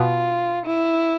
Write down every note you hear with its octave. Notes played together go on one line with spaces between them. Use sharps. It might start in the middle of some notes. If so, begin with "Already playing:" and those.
Already playing: B2 B3 F4
E4